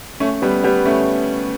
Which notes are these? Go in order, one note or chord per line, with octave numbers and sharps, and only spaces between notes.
A3 C#4
G3 B3
G3 B3
A3 C#4